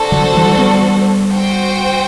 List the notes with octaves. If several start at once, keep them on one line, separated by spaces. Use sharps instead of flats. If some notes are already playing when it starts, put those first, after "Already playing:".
Already playing: D4 F#4 A4 C5
D3 F#3
E3 G3
G3 B3
F#4 C5 G5